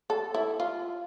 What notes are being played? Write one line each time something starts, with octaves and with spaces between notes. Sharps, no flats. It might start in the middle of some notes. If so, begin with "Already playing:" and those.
A4
E4
F4